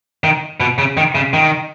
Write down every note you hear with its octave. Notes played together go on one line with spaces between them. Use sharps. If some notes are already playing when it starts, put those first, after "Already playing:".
D#3
B2
C#3
D#3
C#3
D#3